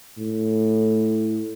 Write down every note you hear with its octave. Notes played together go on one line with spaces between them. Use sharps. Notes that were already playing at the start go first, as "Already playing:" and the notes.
A2